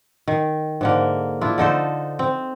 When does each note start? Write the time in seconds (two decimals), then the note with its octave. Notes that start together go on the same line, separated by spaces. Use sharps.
0.28 D#3
0.81 G#2 D3 A#3
1.41 D4 E4 F4
1.58 D3 D#4 A4 C5
2.19 C4